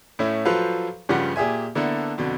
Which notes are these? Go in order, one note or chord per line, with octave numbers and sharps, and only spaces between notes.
A2 A3 C#4 E4
F3 F#3 A4 B4 C5 F5
G2 C#3 F3 G4 F#5
A#2 G4 G#4 E5 G#5
D3 A#3 B3 D4 E4 A4
F2 B2 D3